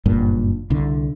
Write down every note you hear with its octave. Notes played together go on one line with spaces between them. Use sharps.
F#1 G2 A#2
C2 D3